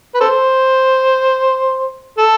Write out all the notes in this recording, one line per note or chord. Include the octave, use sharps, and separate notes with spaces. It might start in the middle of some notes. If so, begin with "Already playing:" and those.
B4
A4 C5
A4